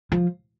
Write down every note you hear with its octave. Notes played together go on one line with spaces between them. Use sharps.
F3